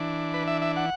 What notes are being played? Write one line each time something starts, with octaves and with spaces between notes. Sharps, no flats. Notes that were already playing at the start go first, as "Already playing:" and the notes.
Already playing: E3 D4
B4
E5
E5
F#5